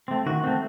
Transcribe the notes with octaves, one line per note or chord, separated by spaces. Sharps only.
A3 C4
D#3 F#4
A3 C4